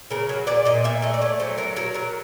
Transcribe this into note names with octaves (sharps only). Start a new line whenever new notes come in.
C#3 A#4
F#3
A#2 D5
A#2 D#5
A#2 E5
A3 D#5
D5
A3 C#5
F#3 C5
F#3 A#4
F#3 A#4
F#3 A#4